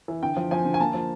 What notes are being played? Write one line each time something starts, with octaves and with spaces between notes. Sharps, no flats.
E3
D3 G5
F3
F3 G#5
D3
G#5
A#3 A5
F3